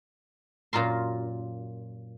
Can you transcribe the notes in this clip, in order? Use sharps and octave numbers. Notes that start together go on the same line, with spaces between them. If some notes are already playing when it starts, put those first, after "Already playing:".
F#2 A#2 F4 A#4 C6